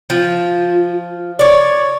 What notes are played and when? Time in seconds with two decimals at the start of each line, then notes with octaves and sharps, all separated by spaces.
0.10 F3 F4
1.39 C#5 D5 C#6